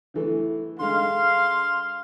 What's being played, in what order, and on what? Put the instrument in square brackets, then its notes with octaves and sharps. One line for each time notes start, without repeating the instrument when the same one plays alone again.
[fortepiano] D3 E3 A3
[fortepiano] D3 G#3 [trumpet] F5 [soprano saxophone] C6